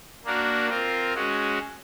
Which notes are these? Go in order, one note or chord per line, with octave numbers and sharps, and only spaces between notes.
A#3 D4 F#4 A#4
C4 F4 A#4
G#3 C#4 F#4